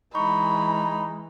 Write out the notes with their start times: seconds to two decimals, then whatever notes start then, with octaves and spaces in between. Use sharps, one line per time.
0.15 E3 G#3 D#4 B5 C#6